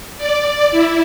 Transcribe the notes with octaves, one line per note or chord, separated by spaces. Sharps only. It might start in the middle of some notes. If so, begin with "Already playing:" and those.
D5
E4